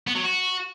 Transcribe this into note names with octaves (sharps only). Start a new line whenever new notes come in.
B3
F#3
F#4